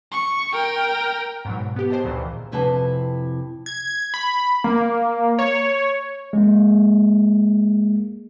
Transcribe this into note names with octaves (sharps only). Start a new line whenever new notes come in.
C#6
A#4 G5
G#2 B2 F#3
B3 G4
G#4 C5 D#5 G5 A5
D2 A#2 D#3 E3
F2 C3 E4 B4 G#5 A5
G#6
B5
A#3
C#5
G#3 A#3